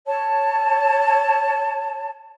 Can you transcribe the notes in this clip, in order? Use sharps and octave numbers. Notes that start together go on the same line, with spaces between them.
C#5 A5